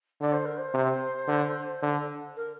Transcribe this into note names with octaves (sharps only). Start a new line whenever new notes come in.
D3 D5
C5
A#4
C5
C3
D3
D3
A#4